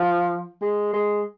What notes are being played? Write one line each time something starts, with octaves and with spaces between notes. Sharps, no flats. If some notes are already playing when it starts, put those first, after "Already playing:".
Already playing: F3
G#3
G#3